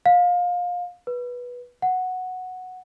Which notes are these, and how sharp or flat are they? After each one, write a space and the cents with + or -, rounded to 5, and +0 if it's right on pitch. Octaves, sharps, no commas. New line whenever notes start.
F5 +25
B4 -15
F#5 -5